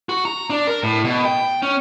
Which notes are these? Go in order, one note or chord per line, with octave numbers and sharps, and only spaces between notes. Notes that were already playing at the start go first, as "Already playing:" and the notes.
F#4
A#5
D4
A#4
A2
B2
G5
C#4